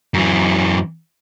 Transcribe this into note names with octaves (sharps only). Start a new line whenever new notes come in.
F#2 E3